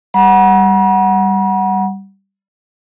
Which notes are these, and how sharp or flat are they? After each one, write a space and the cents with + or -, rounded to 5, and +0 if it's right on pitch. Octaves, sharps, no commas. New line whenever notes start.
G3 +0 F#5 +0 B5 -45